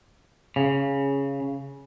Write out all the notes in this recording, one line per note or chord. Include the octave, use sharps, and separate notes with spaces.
C#3